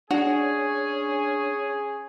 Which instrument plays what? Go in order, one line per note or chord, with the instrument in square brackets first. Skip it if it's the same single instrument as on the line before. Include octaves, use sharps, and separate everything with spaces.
[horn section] C#4 G#4 [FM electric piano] D4 [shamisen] F#4 [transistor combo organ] C#5